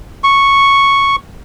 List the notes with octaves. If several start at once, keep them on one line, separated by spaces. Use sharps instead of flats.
C#6